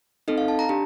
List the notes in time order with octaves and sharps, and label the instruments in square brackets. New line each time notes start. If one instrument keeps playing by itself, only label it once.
[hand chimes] C4 D#4 A4 D#5
F5
A5
A#5
D4 G4 A#5